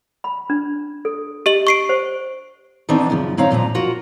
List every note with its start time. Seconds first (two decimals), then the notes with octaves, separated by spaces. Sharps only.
0.24 B5
0.50 D4
1.05 A4
1.46 G4 D#5 F#7
1.67 C#6 C7 D7
1.89 C5
2.89 D#3 E3 B3 C4 D4 D#4
3.10 F#2 C#3 F3
3.37 G2 D#3 C4 C#5 F5 A#5
3.51 F#2 A#2 F3 A#5
3.75 F4 F#4 A#4